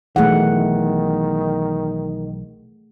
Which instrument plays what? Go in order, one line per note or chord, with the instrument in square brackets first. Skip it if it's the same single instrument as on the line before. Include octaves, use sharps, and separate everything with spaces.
[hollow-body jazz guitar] B1 E3 [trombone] D#3 [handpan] A3 G#4 F#5